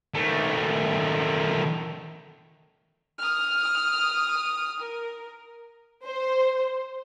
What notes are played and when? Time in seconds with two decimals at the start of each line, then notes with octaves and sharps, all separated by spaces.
0.14 D#3 A3
3.19 D#6 F6
4.80 A#4
6.04 C5